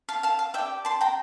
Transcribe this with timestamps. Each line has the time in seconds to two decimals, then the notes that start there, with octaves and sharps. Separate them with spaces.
0.09 F5 A5
0.23 F5 A5
0.39 F5
0.54 G4 D5 E5 G5
0.85 A5 C6
1.01 G5 A#5